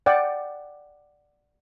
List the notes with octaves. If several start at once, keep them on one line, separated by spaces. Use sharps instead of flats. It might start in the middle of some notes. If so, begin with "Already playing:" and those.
D5 F#5 G5